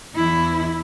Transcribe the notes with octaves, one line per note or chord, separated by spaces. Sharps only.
E2 E4